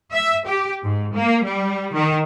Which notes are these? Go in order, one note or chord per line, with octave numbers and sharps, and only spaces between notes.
E5
G4
G#2
A#3
G3
D#3